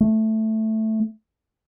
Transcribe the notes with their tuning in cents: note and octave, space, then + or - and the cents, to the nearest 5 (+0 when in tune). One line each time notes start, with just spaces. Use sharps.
A3 +0